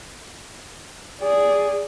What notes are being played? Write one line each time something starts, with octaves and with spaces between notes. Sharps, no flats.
G#4 D5